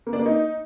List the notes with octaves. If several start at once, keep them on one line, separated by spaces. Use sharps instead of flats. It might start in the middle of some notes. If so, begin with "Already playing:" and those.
A#3
D4
A#3
D#4